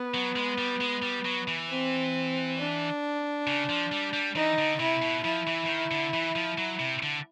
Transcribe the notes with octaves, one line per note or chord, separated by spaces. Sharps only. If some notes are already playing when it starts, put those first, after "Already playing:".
Already playing: B3
F#3
G#3
G3
G#3
G3
F#3
E3
C4
D4
C#3
F3
G3
G3
E3 D#4
D3
C3 E4
B2
F3 E4
E3
E3
D#3
D3
E3
F3
F#3
C3
D3